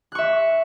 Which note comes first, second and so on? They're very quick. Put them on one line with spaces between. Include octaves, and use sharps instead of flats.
F#6 C#6 E5